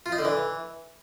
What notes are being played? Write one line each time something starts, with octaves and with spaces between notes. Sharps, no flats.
F4
D#4
D3
E3